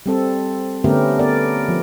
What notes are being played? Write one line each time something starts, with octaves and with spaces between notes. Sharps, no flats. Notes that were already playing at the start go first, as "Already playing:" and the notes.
G3 C4 A4
D3 A3 B3 C#4 G4 A#4
B3 A#4 D5
F3